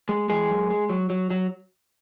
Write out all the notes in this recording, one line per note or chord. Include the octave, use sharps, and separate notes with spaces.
G#3
E3 G#3 G#4
F#2
G#3
F#3
F#3
F#3